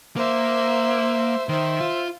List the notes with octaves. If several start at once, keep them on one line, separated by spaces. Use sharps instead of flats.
A#3 C5 E5
D#3 C5 E5
F4